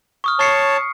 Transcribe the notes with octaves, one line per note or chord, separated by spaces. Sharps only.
C#6 D#6 F6
C#5 A5 C#6 C7 C#7